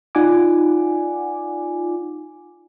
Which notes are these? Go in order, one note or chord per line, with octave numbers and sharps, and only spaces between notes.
D#4 F4 D5 F#5 G#5 D6